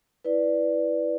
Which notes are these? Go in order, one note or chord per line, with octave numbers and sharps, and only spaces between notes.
E4 B4 D5